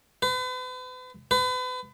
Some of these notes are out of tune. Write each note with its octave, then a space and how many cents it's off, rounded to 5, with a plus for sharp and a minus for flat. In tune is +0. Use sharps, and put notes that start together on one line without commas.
B4 +40
B4 +35